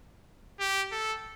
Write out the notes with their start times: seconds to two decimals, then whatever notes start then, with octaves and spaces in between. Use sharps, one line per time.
0.60 G4
0.92 A4